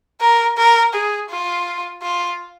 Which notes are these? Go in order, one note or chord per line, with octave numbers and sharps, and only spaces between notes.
A#4
A#4
G#4
F4
F4